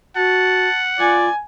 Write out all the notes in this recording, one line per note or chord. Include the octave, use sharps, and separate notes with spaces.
F#4 F#5 A5
F4 D5 G#5